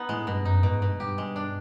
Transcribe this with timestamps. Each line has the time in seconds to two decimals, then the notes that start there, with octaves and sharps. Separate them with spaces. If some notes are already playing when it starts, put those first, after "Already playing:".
Already playing: B3 D#4
0.09 A2 G#3
0.27 G2 B2
0.45 F#2 D#4
0.63 G#2 B2
0.81 G2 B2
1.00 G2 G4
1.18 G#3
1.36 D4